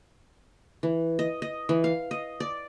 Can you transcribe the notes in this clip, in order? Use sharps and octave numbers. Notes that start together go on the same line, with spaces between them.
E3
D#5
D#5
E3
F5
D#5
D5